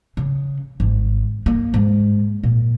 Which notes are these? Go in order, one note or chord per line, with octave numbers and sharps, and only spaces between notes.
C#3
G#1
A#3
G#2
A#2